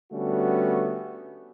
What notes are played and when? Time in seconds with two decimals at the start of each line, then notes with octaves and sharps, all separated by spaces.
0.12 D3 G3 A3 B3 C#4 F#4